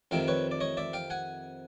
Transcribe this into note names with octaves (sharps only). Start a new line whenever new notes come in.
F2 C3 D#3 F5 G5
B4 C#5
D5
C#5 D#5
D5 E5
F5 G5
F#5 G#5